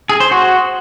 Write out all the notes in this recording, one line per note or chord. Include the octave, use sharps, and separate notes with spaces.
G#4
C5
F#4